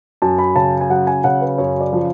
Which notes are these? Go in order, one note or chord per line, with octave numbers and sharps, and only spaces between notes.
F#2 A5
B5
C#3 A5
G#5
F#3 F#5
G#5
C#3 F#5
B4
F#2 C#5
D5
F3